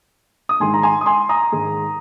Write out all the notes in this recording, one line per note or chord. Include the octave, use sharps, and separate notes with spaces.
D#6
G#2 D#3 G#3 G#5 C6
A#5
G#5 C6
D#6
G#5 C6
A#5 D#6
G#2 D#3 G#3